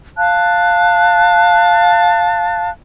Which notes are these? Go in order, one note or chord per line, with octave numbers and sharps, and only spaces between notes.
F5 A5 F#6